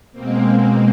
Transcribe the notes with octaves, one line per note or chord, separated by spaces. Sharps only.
B2 G#3 A#3 C4